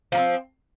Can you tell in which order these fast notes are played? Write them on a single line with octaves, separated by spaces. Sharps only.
F3 A#3 C4